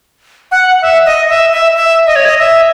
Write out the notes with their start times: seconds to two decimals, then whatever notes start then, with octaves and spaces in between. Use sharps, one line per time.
0.52 F#5
0.82 E5
1.06 D#5
1.29 E5
1.53 E5
1.76 E5
2.07 D#5
2.16 C#5
2.25 D#5
2.39 E5